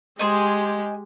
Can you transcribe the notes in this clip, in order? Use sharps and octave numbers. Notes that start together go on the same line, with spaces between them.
G#3 G4 G#4 C5 D#5